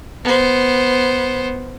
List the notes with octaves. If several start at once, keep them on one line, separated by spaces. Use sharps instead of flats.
B3 C5